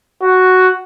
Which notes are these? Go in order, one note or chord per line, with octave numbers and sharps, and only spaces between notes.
F#4